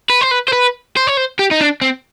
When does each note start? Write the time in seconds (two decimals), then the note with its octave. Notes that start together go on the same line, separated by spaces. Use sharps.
0.10 B4
0.21 C5
0.31 B4
0.48 C5
0.53 B4
0.97 C5
1.07 C#5
1.17 C5
1.39 G4
1.51 D#4
1.61 D4
1.81 C4